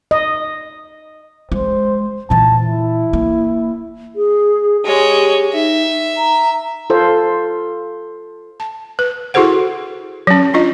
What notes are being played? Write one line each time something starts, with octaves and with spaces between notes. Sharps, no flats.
D#5
G#3 C5
A#2 E3 A5
E4
A#3
G#4
G#3 G4 C#5
D#4 E5
A#5
F4 A4 C5
A5
B4
E4 F#4 G#4 A4 C5 F#5
F#3 C#4
D4 F4 D#5